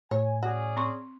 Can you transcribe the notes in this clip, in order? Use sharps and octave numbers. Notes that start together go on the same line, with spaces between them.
A2 C#5 G#5
C#4 F#4 G#4 D5
C4 C6 C#6